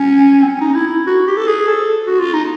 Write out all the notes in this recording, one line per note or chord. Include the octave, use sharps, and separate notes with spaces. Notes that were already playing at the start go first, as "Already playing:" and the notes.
Already playing: C#4
C4
C#4
D#4
E4
E4
F#4
G4
A4
G#4
A4
F#4
F4
D#4